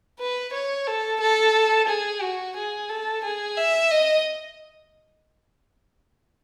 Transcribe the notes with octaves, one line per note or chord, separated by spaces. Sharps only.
B4
C#5
A4
A4
G#4
F#4
G#4
A4
G#4
E5
D#5